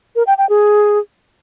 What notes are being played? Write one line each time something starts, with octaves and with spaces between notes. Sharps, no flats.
A#4
G5
G5
G#4